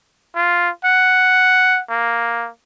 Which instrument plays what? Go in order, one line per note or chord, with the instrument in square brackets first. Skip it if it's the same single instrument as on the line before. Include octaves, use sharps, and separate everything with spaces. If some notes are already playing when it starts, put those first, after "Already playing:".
[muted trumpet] F4
F#5
A#3